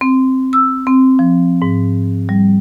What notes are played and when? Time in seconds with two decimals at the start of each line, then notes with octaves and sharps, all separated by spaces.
0.01 C4
0.53 E6
0.87 C4
1.19 F3
1.62 G#2
2.29 G3